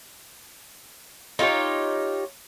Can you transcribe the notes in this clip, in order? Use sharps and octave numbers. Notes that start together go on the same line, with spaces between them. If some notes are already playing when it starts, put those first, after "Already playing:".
D#4 F4 G4 C#5